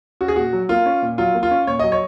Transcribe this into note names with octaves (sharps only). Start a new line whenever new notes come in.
C#4 F#4
G#4
A#2 F#4
F#3
A#3 F4
C#4
A#2
F#3 F4
A#3
F4
C#4
A#2 C#5
F#3 D#5
C#5